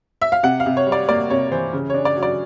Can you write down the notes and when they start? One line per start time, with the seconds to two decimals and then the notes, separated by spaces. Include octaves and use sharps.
0.22 E5
0.32 F5
0.43 C3 F#5
0.60 F5
0.66 C3
0.77 C#5
0.87 G3
0.92 D5
1.09 A#3 D5
1.30 C3 C#5
1.52 E3 C5
1.73 C#3
1.90 D4 C#5
2.05 D5
2.17 F#3
2.23 D5